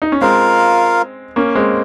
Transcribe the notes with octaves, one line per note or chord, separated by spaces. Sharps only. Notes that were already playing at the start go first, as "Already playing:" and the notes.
D#4
C#4
G#3 C4 F4 A#4 F5
A#3 C#4
G#3 C4